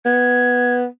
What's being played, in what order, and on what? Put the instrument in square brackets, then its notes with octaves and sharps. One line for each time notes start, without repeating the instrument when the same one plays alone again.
[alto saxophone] B3 [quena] G#6